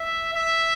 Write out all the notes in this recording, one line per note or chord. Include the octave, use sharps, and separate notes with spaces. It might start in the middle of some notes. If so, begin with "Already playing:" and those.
Already playing: E5
E5